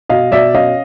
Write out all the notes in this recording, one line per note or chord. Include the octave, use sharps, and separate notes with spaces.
B2 D#5 F5
B2 D5 E5
C#4 D#5 F5